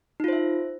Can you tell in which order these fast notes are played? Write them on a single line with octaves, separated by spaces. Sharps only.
D#4 F4 C5 E5